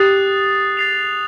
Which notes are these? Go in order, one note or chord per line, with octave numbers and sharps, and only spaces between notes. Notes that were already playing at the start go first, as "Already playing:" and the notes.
Already playing: G4 D#6 F#6 A6 C7
A6 C7 F7